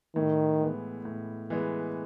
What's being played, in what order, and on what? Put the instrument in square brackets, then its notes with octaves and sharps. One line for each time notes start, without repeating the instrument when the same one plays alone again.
[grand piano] A2 [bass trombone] D#3
[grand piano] E3 G#3 B3
A2
E3 G#3 B3